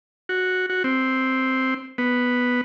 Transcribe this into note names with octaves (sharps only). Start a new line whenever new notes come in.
F#4
F#4
C4
B3